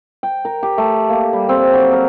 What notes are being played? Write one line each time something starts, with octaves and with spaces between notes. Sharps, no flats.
G5
A#4
G4
A3
A#3
G3
C4
F#3
A#4